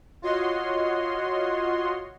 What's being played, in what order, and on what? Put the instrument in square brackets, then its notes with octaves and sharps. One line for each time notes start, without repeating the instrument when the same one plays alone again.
[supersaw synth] F4 F#4 C#5 D#5 C6